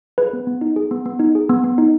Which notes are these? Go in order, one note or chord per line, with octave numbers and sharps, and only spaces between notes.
G#4 B4
B3
B3
D#4
G#4
B3
B3
D#4
G#4
B3
B3
D#4